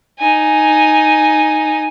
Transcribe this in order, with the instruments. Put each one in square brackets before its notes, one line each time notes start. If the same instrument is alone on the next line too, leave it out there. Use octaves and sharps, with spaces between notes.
[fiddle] D#4 G#5